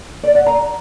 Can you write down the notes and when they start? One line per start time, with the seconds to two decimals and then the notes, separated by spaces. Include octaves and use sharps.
0.23 D5
0.35 F#5
0.46 A#5